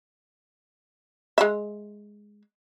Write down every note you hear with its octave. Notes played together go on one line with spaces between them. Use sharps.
G#3 E5